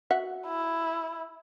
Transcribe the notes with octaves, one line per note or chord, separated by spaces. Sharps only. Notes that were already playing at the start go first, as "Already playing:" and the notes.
F#4 E5 F#5
E4